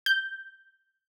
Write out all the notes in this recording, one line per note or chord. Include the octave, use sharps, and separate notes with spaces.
G6